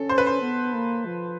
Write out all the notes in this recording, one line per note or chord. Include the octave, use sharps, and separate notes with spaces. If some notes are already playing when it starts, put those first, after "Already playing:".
Already playing: C#4 A4
C5
B4
C5
B3
A#3
F3